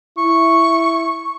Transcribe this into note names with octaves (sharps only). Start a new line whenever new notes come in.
E4 C#6